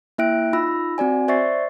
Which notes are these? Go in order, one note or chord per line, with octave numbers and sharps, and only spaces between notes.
A#3 E4 E5 G5 F#6 D7
D#4 F4 B5 E6 A#6
C4 F#4 D5 G#5
C5 D5 E5 C#6 A6 C7